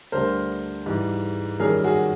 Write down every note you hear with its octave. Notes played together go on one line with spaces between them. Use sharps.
D2 D3 G3 A#4 C5
G#2 E3 G3
F#2 D#3 G3 G#4 A#4
F#4 G#4